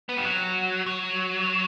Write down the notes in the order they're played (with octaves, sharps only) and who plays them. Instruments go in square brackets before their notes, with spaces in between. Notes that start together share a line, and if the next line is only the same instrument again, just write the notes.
[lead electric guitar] B3
G3
F#3
F#3